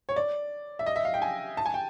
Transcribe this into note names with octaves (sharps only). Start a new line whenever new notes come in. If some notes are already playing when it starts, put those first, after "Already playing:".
C#5
D5
E5
D#5
E5
F5
G5
G#5
A5
G#5
G5